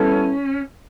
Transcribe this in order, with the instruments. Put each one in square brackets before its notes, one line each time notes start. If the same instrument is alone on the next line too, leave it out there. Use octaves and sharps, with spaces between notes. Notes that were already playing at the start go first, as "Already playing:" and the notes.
Already playing: [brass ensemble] G3 B3 E4 A4 [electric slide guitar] C#4